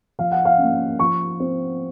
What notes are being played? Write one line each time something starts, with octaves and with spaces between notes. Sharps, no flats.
F3 F5
F#5
F5
A#3 C#4
F3 C#6
C4